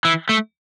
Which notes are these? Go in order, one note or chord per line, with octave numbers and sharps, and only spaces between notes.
E3
A3